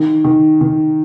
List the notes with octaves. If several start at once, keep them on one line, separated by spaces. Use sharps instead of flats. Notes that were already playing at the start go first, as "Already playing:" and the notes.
Already playing: D#3
D#3
D#3